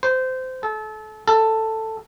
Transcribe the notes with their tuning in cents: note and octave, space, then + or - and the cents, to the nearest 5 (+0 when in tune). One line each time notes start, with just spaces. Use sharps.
C5 -20
A4 -30
A4 +10